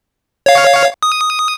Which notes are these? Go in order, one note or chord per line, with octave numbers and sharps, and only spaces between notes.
C#5 F5
D#6